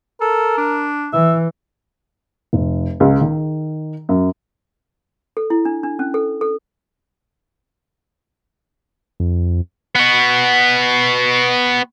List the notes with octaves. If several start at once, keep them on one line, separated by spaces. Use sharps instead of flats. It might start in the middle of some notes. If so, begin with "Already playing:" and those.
A4 A#4
D4
E3 E5
F1
C#2
D#3
F#2
A4
E4
D4
D4
C#4
A4
A4
F2
B3 F#4